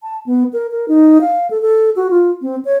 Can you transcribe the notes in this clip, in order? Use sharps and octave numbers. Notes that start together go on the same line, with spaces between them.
A5
B3
A#4
A#4
D#4
F5
A4
A4
F#4
F4
C4
C#5